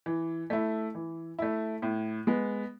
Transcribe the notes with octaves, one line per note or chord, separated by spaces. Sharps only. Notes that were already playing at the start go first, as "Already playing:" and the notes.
E3
A3 E4
E3
A3 E4
A2
G#3 B3